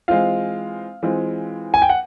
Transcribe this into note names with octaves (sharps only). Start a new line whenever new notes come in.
E3 G#3 C4 F4 F5
E3 G#3 C4 F4
G#5
G5
F#5